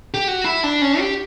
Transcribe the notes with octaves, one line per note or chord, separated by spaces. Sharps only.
G4
F#4
E4
D4
C#4
G4